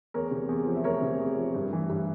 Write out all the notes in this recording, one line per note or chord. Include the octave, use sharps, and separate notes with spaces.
E2 A#4 C#5
C3
E2
F3
E5
E2 A#4 C#5
C3
E2
F3
G2
E3
G2